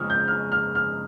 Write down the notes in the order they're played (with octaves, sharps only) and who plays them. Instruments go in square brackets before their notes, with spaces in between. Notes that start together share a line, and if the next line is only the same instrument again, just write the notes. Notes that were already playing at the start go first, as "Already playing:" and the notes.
Already playing: [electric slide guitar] F2 C#3 F3 G#3 C#4 [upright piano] D#6 F6
[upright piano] G6
F6
F6
F6